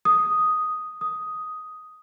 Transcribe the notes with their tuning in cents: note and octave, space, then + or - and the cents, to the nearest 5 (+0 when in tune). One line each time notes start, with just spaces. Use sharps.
D#6 +0
D#6 +5